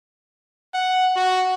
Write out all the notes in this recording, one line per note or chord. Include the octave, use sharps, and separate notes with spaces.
F#5
F#4